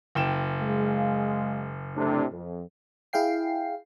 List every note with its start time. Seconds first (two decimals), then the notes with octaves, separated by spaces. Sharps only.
0.15 F#1 G5 E7
0.61 G#3 F5
1.96 A2 C3 D4
2.32 F2
3.13 E4 G#4 F5 G5 C7